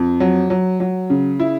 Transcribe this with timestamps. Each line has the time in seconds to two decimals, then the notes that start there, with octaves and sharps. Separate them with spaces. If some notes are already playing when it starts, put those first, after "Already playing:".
Already playing: F2
0.20 F#3
0.50 F#3
0.80 F#3
1.10 C#3
1.40 E4